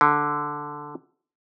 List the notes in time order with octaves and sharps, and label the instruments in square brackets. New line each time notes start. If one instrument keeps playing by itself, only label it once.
[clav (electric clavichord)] D3